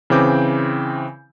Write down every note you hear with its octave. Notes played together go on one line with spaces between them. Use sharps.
C#3 E3 C4 D6 G6